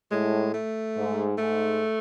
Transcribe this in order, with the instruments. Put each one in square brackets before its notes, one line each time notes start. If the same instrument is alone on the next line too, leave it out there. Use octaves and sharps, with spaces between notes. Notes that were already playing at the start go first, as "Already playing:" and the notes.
[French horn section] A2 [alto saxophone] G#3
[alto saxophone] A3
[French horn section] G#2
[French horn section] G#2 [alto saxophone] A3